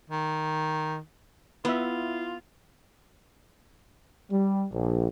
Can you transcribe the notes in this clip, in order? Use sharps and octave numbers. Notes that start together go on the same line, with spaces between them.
D#3
B3 E4 F4 B4 E5
G3
A#1